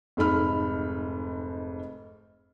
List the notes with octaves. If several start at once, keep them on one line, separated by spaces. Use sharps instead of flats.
F1 G#2 A4 B5 F6